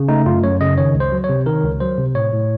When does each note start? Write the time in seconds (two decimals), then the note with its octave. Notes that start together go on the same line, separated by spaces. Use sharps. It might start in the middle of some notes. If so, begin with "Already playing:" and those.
Already playing: C#3
0.08 A3 D#4
0.25 F#2 F4
0.43 F#2 C#5
0.60 C#3 D#5
0.78 D#3 C#5
0.95 C#2
1.00 C5
1.12 F#3
1.24 C#5
1.29 C3
1.46 D#3 A#4
1.64 C#2
1.80 F#3 C5
1.98 C3
2.15 A2 C#5
2.33 A2